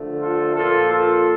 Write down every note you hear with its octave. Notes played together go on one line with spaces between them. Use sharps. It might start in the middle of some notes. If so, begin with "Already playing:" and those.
Already playing: D3 F3 A3
F4 A4
A#2 F3 A#3 F4 A4
F4 A4